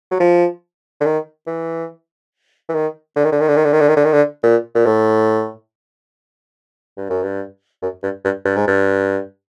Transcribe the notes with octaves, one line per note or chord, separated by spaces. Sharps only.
F#3
F3
D3
D#3
E3
E3
D#3
D3
D#3
D3
D#3
D3
D#3
D3
D#3
D3
D#3
D3
D#3
D3
A#2
A#2
A2
G2
F#2
G2
F#2
G2
G2
G2
G#2
G2